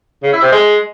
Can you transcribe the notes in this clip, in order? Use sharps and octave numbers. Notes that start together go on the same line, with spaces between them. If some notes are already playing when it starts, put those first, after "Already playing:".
C#3
E4
C3
G#3